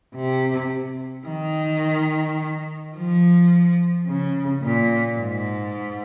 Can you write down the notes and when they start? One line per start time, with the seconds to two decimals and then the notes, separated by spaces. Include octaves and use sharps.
0.15 C3
1.27 D#3
2.95 F3
4.07 C#3
4.62 A#2
5.18 G#2